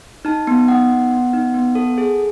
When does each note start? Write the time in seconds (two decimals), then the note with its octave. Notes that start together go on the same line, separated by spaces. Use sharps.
0.25 D#4 A5
0.47 B3
0.68 D#4 F#5
0.90 B3
1.11 B3
1.33 D#4
1.54 B3
1.75 A4
1.98 G#4